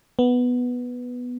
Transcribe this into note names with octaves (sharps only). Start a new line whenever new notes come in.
B3